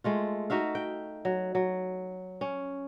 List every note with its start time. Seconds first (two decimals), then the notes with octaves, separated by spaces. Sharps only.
0.04 G#3 A3 F4
0.50 D#4 F#4 E5 F5
0.75 G5
1.25 F#3
1.55 F#3
2.41 C#4